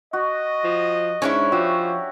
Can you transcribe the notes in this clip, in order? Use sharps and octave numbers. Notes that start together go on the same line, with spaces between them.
F#4 D#5
F3
G#2 C#4 D4 E4 C#5
F3 F#4 G4 E5